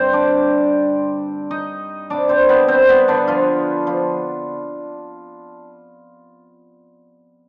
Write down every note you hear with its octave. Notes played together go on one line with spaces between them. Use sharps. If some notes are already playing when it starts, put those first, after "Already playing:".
Already playing: G2 D3 G3 C4 C5
D4 D5
D#4 D#5
C3 G3 D4 D5
C4 C5
B3 B4
C4 C5
B3 B4
D3 D4
F3 F4
F3 F4